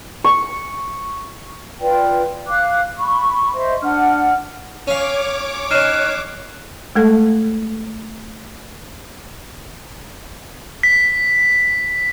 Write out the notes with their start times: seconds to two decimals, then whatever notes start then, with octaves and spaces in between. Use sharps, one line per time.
0.24 C#6
1.81 F4 B4 D5 G5
2.47 F5 D6 F#6
2.98 B5 C#6
3.54 C5 D#5 E5 C6
3.83 D4 F#5 F6
4.87 C#4 C#5 F5 D6
5.71 C#4 D#4 F6 F#6 C7 E7
6.95 G#3 A3 A4
10.83 B6